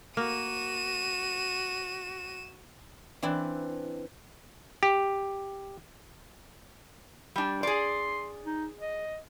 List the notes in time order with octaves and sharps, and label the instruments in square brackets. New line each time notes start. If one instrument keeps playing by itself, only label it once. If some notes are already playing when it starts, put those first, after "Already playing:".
[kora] A#3 [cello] F#4 [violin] D#7 E7
[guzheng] E3 C4 D4 E4
[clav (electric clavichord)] G4
[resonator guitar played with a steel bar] G3 D4
[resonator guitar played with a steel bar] G#4 D5 [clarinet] C6
[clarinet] D#4
D#5